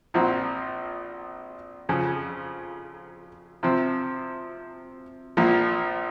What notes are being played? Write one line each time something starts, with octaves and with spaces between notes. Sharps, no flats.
A#1 A#2 F3 C4 F#4
F2 C#3 F3
C3 F3 C4
A#1 A#2 F3 A#3